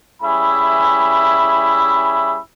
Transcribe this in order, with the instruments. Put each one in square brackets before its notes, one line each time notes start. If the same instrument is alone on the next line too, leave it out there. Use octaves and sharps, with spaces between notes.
[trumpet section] G3 C#4 E4 G#4 E5 B5